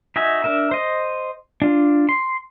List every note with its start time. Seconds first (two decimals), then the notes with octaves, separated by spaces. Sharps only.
0.16 D#4 F#4 E5 G#5
0.44 D4 A#4 E5
0.71 C5 D#5
1.62 D4 F4
2.09 C6